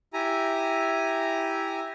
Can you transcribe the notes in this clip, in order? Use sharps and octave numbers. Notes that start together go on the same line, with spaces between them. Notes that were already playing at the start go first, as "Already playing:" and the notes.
E4 G4 G#5 A#5